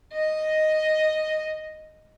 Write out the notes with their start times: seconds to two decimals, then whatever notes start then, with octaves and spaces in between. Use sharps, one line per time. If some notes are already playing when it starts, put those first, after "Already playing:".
0.12 D#5